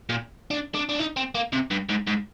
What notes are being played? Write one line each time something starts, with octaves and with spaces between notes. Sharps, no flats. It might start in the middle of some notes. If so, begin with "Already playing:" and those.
A#2
D4
D4
D4
D#4
C4
A#3
C3
G2
G#2
G#2